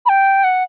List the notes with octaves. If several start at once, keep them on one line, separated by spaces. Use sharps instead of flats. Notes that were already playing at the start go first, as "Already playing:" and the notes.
B5
G5
F#5